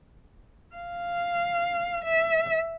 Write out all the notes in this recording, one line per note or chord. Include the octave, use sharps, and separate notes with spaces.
F5
E5